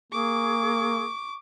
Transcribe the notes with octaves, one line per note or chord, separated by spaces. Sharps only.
A#3 G#4 C#6 D6